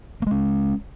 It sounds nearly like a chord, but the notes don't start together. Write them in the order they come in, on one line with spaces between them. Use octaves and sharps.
A#3 G#3 C#4